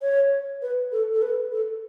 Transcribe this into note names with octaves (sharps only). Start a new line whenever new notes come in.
C#5
B4
A4
A4
B4
A4